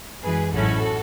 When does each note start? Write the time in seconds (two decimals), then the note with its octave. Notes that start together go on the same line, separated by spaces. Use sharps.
0.22 F#2 E3 G#3 G#4 B4
0.52 A1 G#2 F#3 C#4 E4 F#4 A4